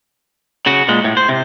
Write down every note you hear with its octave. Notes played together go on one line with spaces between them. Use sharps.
C#3 F#4
A#2 G#3
A2
C5
C3